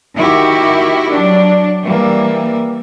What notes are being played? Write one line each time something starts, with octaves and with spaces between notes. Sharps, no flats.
D#3 E4 F#4 G4 A#4
F#3 D4
E3 G3 A#3